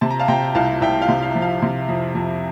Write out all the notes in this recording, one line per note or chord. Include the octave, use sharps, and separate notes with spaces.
C3 A5
A#5
F5 A5
C3 G5 A#5
C2 F5 A5
C2 E5 G5
F5
C3
F5
F3
F5
C3
F2
F2